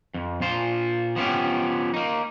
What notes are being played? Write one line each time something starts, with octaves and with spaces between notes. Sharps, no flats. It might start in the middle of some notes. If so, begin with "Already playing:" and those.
F2
A#2 F4 C5
F3 B3 C#4 G4
A#3 D#4